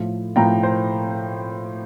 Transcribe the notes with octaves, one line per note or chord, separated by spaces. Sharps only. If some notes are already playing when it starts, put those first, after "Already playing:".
Already playing: A2 F3 A3
A2 F3 A3 G5 A#5
C5